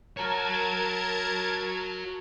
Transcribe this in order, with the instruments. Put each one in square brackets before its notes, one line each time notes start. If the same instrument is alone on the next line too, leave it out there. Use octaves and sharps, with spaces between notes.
[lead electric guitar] F#4 C#5 [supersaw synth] A#4 A5 G#6